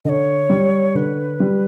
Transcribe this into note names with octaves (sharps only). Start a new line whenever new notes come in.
D3 C#5 D#5
G3
D3 B4
G3